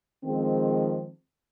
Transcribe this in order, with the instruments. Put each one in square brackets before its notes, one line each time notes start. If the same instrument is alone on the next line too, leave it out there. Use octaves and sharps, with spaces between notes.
[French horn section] D#3 F3 G#3 C4